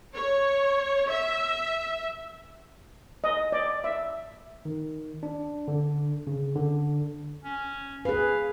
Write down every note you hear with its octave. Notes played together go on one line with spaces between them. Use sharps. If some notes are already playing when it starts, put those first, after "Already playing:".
C#5
E5
D#5
D5
E5
D#3
D4
D3
C#3
D3
C#4
G#4 B4 F5